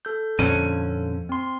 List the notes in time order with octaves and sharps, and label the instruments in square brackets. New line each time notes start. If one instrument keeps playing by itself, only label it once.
[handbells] A4 G6
[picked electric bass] F2 [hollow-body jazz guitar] A#2 D3 C#4 [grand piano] D#7
[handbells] C4 C6